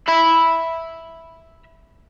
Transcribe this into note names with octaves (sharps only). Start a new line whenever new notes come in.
E5 B5